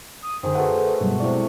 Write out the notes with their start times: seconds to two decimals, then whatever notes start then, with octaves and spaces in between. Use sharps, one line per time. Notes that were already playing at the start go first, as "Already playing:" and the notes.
0.22 D#6
0.43 F#2 D3 D#3 G#4 C5
0.55 A3 F#4 A4 B4 F#5
1.01 G2 B2 F#3 G3
1.20 C3 G#3 E4 D5 C#6